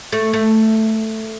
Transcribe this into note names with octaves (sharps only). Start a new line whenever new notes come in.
A3
A3